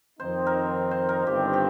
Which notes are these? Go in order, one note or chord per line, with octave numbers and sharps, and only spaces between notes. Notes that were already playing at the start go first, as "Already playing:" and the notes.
F2 D#3 C4 D#4 C5
A#4
C5
A#4
G1 G2 D#3 C4 G4
G4